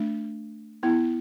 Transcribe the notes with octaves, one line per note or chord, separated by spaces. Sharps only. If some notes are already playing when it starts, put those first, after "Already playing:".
Already playing: A3 D4
B3 E4